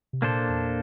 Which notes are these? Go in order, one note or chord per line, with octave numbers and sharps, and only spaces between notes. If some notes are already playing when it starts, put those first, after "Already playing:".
C3
A#2 A#3 D4 A4 C5
E2